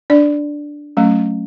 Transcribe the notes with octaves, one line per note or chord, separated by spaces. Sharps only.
D4 D5
F#3 A3 C#4